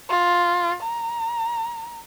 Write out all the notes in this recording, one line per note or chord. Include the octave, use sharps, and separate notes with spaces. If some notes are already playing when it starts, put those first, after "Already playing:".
F4
A#5